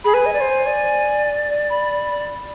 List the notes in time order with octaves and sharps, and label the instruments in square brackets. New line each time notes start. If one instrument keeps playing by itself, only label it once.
[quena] G#4 [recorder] B5
[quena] B4 [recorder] G#5
[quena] D#5
D5
C5
D5
[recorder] B5